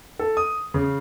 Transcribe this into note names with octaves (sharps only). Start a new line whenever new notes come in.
A4
D#6
C#3